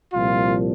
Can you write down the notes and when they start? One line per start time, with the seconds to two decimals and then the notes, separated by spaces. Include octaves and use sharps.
0.13 C2 A#2 F3 F4